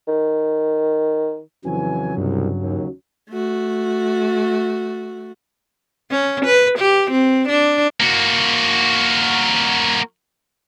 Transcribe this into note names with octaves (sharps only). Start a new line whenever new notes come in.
D#3
F2 C#3 E3 F#3 G#5
C2 G2
D#2
A3 F#4
C#4
B4
G4
C4
D4
A#3 F#4